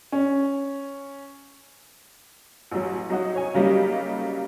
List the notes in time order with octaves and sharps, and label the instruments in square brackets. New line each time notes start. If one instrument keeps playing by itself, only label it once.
[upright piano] C#4
[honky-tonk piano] A1 F#3
F#3 D#4 F#4
C#5 G#5
C#3 F#3 G3 A#3 D#4